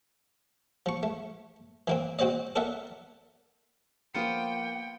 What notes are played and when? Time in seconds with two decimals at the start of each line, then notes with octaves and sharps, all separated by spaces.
0.86 F3 C#6
1.03 A3
1.88 E3 A#3 C4
2.19 C4 F#4 C5 D5 D#5
2.56 A4 A#4 D5 E5 F#5
4.15 F3 A#3 B3 F4 C5 G5 C#7